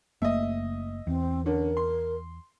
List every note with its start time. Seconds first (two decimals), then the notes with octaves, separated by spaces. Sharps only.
0.22 F#1 A3 A#3 D#5 E5
1.07 E2 C4
1.46 D3 C#4 A#4
1.77 C6